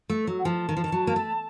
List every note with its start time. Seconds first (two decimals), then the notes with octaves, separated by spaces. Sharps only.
0.10 A3
0.27 F#3
0.39 F#5
0.45 F3 A5
0.69 D#3
0.77 F3
0.84 D#3
0.92 F#3
1.07 A#3
1.16 A3